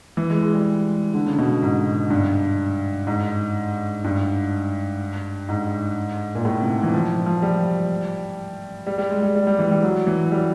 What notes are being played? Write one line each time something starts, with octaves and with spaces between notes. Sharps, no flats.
E3
G#3
G#3
G3
D3
C#3
B2
G#2
G2
G#2
G2
G#2
A#2
A2
C3
E3
F3
F3
G3
G3
G3
G#3
G3
G3
G3
E3
G3
F#3
E3
F#3
G3